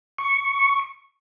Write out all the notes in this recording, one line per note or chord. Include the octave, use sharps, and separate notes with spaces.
C#6